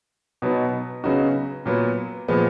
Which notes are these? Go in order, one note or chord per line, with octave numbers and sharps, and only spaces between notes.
B2 F#3 B3 D#4
C#3 F#3 B3 D#4 F#4
A#2 F#3 B3
A#2 F3 G#3 B3